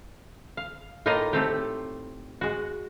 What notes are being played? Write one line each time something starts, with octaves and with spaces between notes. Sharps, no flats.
F5
A2 A#3 D#4 F4 D#5 F5
A3 C4 G4
G#3 F#4